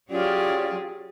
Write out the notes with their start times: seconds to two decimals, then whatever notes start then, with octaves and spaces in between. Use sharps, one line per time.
0.10 F#3 C#4 F4 G4 G#4 D5